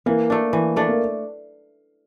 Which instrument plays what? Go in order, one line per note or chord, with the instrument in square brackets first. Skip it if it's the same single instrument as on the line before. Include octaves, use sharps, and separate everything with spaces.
[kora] E3 [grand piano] A#3
[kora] A3 D4
E3
A3 D4
[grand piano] A#3